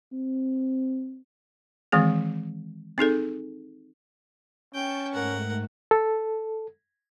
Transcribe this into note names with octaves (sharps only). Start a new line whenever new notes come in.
C4
D#3 E3 G#3 C4 G#4
C4 D#4 G#4 A4
C#4 G5 A5 C#6
G#2 A3 A#4 F#5
A4